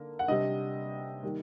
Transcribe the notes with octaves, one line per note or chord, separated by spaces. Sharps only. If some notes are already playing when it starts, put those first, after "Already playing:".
Already playing: D3 A#3
F#5
C3 G3 D4 D#5
D#3 G3 A#3